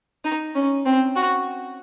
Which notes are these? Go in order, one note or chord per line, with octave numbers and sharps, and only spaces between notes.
D#4
C#4
C4
F#4